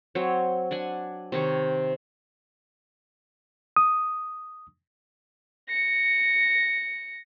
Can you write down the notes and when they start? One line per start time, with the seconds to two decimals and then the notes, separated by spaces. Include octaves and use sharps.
0.15 F#3 C4 C#5
0.71 D4 F#5 G#5
1.32 C3 D#3 C#5
3.76 D#6
5.69 A#6 C#7